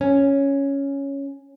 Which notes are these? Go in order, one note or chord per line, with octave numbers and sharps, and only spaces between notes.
C#4